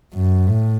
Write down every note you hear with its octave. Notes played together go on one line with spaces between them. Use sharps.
F#2
A2